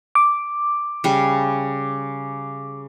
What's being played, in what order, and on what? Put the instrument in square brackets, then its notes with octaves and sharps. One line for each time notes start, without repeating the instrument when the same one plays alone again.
[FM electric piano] D6
[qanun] C#3 G3